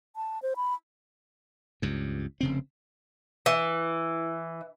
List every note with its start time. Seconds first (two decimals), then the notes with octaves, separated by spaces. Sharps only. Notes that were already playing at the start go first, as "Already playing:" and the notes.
0.16 A5
0.42 C5
0.56 B5
1.82 C#2 G2
2.41 F1 C#3 C4
3.46 E3